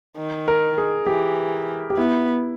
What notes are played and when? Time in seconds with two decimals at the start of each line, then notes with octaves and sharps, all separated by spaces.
0.17 D#3
0.48 A#4
0.78 G#4
1.07 E3 G4
1.90 G4
1.97 B3 E4